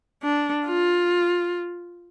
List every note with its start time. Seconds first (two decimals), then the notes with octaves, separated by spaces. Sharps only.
0.23 D4
0.66 F4